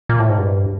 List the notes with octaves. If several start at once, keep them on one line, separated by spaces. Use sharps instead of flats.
A#2
A2
G#2
G2